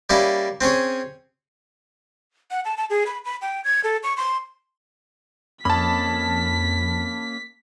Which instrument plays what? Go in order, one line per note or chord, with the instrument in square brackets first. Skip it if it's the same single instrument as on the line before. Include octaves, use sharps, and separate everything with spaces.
[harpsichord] G3 A#3 C#4 E4 D5
C4 C#4 G#4 C#5
[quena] F#5
A5
A5
G#4
B5
B5
G5
G#6
A4
C#6
C6
[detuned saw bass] F2 [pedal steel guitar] A#3 C#4 D#5 [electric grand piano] A5 B5 [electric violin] B6